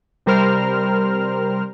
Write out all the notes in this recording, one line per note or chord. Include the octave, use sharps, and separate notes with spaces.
C3 G3 A#4 C5 F6